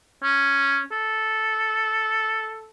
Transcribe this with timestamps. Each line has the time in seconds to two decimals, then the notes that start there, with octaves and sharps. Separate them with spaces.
0.23 C#4
0.91 A4